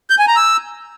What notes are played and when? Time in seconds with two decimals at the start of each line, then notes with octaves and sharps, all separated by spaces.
0.10 G6
0.19 G#5
0.27 A#5
0.36 E6